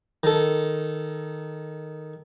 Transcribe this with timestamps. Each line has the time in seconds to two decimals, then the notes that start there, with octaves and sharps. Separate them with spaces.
0.23 D#3 A4